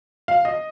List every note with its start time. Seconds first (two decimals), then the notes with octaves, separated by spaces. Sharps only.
0.28 F5
0.45 D#5